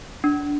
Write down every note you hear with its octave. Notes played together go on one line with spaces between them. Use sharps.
D4